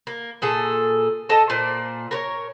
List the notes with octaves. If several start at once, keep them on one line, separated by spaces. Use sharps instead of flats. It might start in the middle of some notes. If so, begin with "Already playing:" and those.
A#3
A#2 G#4 A4
A4 D#5 A5
A#2 C5 D5
A#4 B4 C#5